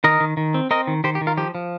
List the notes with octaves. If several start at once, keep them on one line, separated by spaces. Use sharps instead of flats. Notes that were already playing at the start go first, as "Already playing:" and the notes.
D#3 A#4 D#5
D#3
D#3
C4
C4 A#4 D#5
D#3
D#3 G4 C5
G4
D#3
F4 A#4
F3 G4
F3